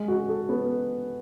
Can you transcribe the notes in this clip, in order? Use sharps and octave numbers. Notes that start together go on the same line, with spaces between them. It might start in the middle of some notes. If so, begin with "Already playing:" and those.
Already playing: G#3
F#4
A4
B3